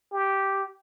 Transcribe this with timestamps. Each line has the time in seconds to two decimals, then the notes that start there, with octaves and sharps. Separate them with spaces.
0.12 G4